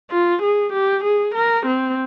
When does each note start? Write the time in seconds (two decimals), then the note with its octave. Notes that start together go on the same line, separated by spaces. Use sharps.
0.10 F4
0.42 G#4
0.73 G4
1.04 G#4
1.35 A#4
1.66 C4